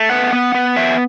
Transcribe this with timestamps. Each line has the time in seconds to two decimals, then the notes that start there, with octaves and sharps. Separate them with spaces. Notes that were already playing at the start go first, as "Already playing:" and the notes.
Already playing: A3
0.10 B3 F#5
0.33 B3
0.54 B3
0.76 F#3 E5